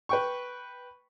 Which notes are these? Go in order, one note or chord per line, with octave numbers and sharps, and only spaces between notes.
B4 G5 C#6